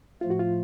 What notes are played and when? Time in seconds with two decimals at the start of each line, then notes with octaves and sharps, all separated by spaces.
0.21 A2 F3 A3 F4
0.30 F#4
0.39 F4